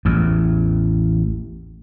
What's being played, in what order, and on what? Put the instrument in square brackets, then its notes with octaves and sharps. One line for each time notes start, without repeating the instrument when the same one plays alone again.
[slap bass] A1 E2